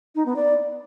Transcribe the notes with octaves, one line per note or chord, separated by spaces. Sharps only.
D#4
B3
D5